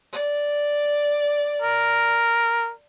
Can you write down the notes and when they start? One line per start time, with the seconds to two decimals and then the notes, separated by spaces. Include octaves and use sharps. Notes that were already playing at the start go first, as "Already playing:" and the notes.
0.12 D5
1.62 A#4